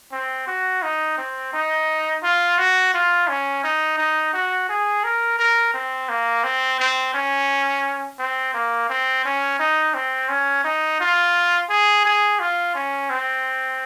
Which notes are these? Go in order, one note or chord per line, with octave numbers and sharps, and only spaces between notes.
C4
F#4
D#4
C4
D#4
F4
F#4
F4
C#4
D#4
D#4
F#4
G#4
A#4
A#4
C4
A#3
C4
C4
C#4
C4
A#3
C4
C#4
D#4
C4
C#4
D#4
F4
G#4
G#4
F4
C#4
C4